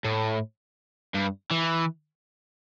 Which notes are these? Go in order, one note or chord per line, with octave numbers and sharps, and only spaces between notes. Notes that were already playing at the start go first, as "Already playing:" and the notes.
A2
G2
E3